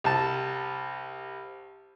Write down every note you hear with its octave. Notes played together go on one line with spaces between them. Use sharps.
C2 A5